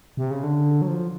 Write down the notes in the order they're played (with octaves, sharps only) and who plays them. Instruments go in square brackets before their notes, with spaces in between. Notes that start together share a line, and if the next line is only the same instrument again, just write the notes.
[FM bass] C3
C#3
D3
F#3
F3